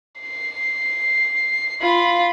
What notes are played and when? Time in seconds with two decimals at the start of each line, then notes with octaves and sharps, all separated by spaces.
0.21 C7
1.81 F4 B5